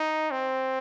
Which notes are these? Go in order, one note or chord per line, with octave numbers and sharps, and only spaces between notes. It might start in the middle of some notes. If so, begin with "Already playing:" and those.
Already playing: D#4
C4